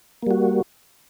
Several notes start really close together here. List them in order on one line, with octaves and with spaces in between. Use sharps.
A#3 G3 F#4